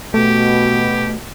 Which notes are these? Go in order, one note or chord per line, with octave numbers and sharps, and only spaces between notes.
B2 A3 G4